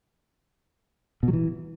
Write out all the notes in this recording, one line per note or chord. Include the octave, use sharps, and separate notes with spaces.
B2
F#3
E3